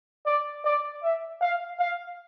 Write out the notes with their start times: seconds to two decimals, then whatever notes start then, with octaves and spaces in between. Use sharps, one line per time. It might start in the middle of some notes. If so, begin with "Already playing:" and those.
0.26 D5
0.65 D5
1.03 E5
1.41 F5
1.79 F5